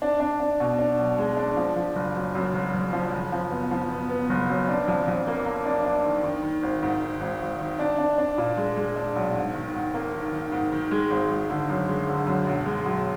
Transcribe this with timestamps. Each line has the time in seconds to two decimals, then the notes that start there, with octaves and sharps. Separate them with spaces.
0.02 D4
0.20 D4
0.40 D4
0.60 B2
0.79 D4
0.98 B1
1.18 G#3
1.37 D4
1.56 F3
1.76 F3
1.96 F#1
2.16 F#2
2.35 F#2
2.54 F#1
2.74 F#1
2.93 F3
3.13 F#1
3.32 F3
3.51 B3
3.71 F3
3.90 B3
4.10 B3
4.29 F#1
4.49 F#2
4.69 D4
4.88 F2
5.08 F2
5.27 A#3
5.46 A#3
5.65 D4
5.85 D4
6.05 D#3
6.24 D#3
6.43 D#3
6.63 G#1
6.83 G#2
7.02 D#3
7.21 G#1
7.41 G#1
7.61 D#3
7.79 D4
7.99 D4
8.18 D4
8.38 A#2
8.57 G#3
8.77 G#3
8.96 D4
9.15 B1
9.35 G#2
9.55 D#3
9.74 G#2
9.94 A#3
10.13 D#3
10.32 D#3
10.52 G#2
10.72 D#3
10.91 G#3
11.11 G#1
11.30 G#3
11.50 D3
11.69 F#2
11.88 G#3
12.08 D3
12.27 F#2
12.47 B1
12.66 G#3
12.85 B1